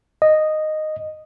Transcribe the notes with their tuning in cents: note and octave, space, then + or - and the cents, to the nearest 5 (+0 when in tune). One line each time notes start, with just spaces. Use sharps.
D#5 -10